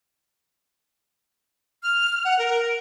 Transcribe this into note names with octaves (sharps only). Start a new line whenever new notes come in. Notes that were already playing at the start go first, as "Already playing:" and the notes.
F6
F#5
A#4